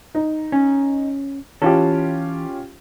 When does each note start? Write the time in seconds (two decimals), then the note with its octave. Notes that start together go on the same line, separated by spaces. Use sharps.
0.15 D#4
0.52 C#4
1.62 E3 C#4 F4 G4 A4